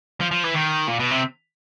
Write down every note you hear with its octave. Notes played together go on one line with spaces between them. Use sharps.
F3
F3
E3
D#3
A#2
B2
C3